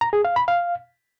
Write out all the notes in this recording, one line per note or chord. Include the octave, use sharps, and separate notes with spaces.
A#5
G#4
F5
B5
F5